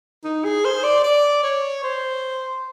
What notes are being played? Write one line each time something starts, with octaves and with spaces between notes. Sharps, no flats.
D#4
G#4
C5
D5
D5
C#5
C5